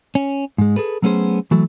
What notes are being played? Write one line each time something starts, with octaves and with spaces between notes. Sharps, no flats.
C#4
G#2 G#3
G#4 A4 B4
F#3 A3 B3 C#4 G#4 C5
E3 F#3 A3